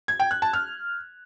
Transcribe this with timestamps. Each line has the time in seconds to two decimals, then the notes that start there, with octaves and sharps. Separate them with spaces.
0.08 G#6
0.20 G5
0.31 F#6
0.42 A5
0.53 F6